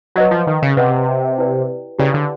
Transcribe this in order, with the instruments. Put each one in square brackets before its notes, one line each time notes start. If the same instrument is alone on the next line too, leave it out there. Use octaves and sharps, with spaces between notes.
[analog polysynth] F#3 [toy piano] B4 D#5 F#5
[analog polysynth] F3
D#3
C#3
[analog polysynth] C3 [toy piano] B4 D#5 F#5
[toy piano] E4 G4 B4 D5 G5
[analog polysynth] C#3 [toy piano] E4 G4 B4 D5 G5
[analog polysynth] D3